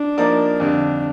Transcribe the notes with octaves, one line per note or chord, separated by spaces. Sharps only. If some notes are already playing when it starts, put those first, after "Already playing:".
Already playing: D4
F3 A#3 D#4 A#4 D5
F2 D3 G3 D4